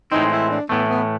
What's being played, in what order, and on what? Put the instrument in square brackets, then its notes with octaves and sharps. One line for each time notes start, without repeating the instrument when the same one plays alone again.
[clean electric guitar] A2 E3 G#3 C4 [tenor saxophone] D#4
[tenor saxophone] E4
D4
[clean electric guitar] A2 E3 A3 [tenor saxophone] B3
[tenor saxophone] B3